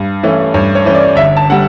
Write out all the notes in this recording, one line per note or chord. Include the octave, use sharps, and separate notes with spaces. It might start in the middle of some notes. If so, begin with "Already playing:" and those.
Already playing: G2
E3 A3 C#4
G2 C#5
C#5
E3 A3 C#4
D5
G1 E5
A5
D3 G3 F#5